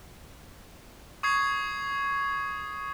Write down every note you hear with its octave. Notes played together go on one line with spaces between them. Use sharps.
C#6 D#6 G#6 C7